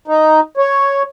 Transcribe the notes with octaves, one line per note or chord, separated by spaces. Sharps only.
D#4
C#5